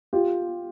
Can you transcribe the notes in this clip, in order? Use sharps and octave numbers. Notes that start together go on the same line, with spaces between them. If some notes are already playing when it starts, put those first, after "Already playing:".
F4 G4